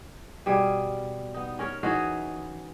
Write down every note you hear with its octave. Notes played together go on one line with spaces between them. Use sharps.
B2 G3 G#4
B3 D#4
C#4 A#4 C#5
E3 D#4 F#4 G#4